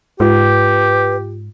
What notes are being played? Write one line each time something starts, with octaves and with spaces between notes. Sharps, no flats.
G#2 F4 G4 B4